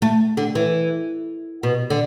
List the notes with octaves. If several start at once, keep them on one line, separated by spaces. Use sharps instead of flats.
A3
D3
E3
B2
D3